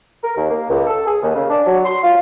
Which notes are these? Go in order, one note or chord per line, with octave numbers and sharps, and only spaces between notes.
A#4
D#2
A#3
C#2
A4
G#4
D#2
C#3
D4
F#3
C6
F4